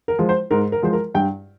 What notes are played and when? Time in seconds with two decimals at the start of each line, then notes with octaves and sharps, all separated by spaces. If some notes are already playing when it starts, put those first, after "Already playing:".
0.08 A#4
0.18 F3 G#3
0.29 C5
0.51 G#2 A#4
0.72 A#4
0.82 F3 G#3 C5
0.93 A#4
1.15 G2 G5